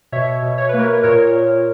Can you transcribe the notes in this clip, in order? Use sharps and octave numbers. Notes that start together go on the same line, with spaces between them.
B2 C#5 E5
B2
C#5
A#3 B4
A#4 C#5
A#2 A#4 C#5
A#2